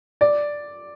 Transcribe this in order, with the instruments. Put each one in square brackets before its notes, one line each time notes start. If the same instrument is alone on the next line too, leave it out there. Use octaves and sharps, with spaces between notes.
[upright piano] D5